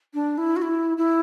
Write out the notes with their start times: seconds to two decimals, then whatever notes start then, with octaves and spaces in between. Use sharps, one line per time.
0.14 D4
0.38 E4
0.56 F#4
0.62 E4
0.97 E4